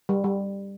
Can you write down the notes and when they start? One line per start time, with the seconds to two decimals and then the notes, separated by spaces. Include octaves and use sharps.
0.09 G3
0.24 G3